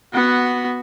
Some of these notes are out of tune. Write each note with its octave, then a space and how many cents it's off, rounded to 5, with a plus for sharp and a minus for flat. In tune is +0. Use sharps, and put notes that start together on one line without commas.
B3 +0 F#4 +0